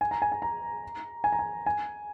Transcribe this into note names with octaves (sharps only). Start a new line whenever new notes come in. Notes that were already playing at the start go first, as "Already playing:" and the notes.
G#5
A#5
G#5
G#5
A#5
G#5
A#5
G#5
G#5